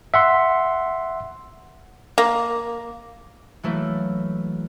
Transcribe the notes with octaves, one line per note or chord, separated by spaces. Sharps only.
E5 F#5 C6
A#3
E3 F#3 A3 A#3 E4